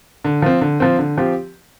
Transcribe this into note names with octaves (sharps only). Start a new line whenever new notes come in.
D3
F3 C4
D3
F3 C4
D3
F3 C4 G4